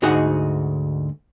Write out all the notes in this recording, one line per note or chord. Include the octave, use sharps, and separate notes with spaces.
D2 G#2 D#4 F#4 G#4 F#5